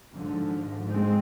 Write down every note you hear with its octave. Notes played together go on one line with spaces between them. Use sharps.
G#1 G#2 D3 F3
G#3 C4